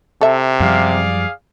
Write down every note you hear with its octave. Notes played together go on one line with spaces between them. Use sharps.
C3 A4 E5
F#2 F3 G3 G#4 D5 F5